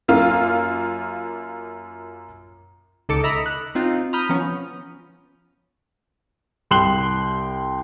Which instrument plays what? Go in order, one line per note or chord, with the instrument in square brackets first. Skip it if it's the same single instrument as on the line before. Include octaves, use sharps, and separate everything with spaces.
[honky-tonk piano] F#2 A#3 F4 F5
[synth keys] C#2 D#4 A4 D6 C#7
D#5 E5 A#5 B5
F#6
C4 D#4 F4
A#5 B5 D#6 F6 G6 B6
F3 B3 C#4
[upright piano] C2 G5 C6 F#6 F#7 G7